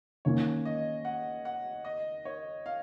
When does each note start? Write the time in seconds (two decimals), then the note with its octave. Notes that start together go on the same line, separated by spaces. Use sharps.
0.25 D#3 A#3 C#4 C#5
0.65 D#5
1.05 F#5
1.45 F#5
1.85 D#5
2.25 C#5
2.66 F5